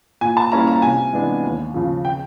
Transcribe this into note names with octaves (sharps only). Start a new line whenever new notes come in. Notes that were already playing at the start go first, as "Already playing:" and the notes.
A#2 G#5
A5
G3 A#3 C#4 E4 A#5
A#5
C3 G#5
E3 G#3 B3 D4
D#2
C#3 F3
G5